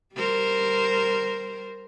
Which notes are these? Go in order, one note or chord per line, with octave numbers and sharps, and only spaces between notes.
G3 A#4 C5